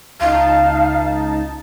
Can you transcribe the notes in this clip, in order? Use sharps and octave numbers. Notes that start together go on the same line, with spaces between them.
C#2 D#4 F5 A5